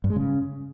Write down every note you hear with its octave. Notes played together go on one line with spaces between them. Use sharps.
G2
G#3
C#3